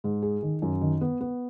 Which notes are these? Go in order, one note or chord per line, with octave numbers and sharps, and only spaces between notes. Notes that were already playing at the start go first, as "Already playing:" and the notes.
G#2
G#4
D#3
F#2
D#3
B3
B3